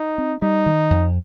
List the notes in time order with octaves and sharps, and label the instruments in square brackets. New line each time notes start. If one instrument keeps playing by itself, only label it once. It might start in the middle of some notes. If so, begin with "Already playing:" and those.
Already playing: [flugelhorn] D#4
[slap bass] C4
[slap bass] G3 [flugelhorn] D#4
[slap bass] D#3
F2